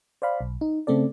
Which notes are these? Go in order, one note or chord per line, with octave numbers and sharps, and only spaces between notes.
C5 D5 F5 B5
B1
D#4
C#3 A3 C4 A4 D5